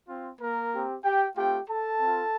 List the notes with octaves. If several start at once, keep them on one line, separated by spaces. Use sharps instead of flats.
C4 F4
A#3 A#4
C4 G4
G4 G5
A3 C4 F4 G4 G5
A4 A5
C4 F4